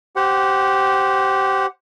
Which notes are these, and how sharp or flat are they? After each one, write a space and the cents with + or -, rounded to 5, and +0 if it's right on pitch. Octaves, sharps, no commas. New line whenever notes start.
G4 -15 C5 +0 F#5 +0